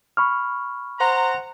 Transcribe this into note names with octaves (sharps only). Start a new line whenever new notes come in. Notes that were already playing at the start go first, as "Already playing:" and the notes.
B5 C#6 F6
C5 F#5 A#5